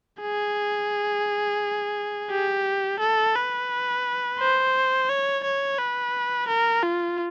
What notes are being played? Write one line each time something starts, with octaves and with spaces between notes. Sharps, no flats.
G#4
G4
A4
B4
C5
C#5
C#5
B4
A#4
F4